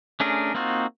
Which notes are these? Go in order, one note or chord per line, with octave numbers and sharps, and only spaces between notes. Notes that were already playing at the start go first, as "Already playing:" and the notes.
A3 C#4 D4 G#4 A#4
A#3 C4 D#4 F4 F#4